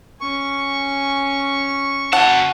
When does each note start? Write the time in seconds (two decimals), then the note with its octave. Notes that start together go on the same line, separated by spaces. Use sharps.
0.21 C#4 G#5 C#6
2.13 F#4 F#5 A5